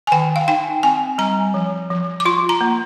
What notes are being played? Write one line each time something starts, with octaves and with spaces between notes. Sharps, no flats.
G#5
D#3 G5
F5
D#4 G5
C4 G#5
G3 A#5
F3
F3
D6
F4 C6
A#5
A#3